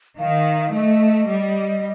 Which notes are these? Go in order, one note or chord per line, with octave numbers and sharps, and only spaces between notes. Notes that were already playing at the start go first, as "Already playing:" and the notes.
D#3 F5
A3 D#5
G3